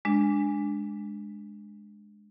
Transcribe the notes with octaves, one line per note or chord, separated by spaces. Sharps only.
G#3 D4